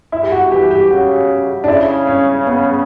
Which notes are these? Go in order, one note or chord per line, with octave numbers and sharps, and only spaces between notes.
E4
G4
F#4
E3 G4
G4
C#3 F#4
D4
C#3 E4
C#4
B3